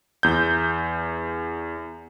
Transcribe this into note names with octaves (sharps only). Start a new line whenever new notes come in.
E2 G6